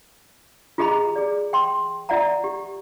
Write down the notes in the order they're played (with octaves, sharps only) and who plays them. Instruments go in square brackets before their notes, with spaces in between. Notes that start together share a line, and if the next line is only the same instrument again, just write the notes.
[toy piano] F4 G4 G#4 D#5 A#5 B5
G#4 D5
G5 C6
F4 D5 E5 F#5 A#5
G4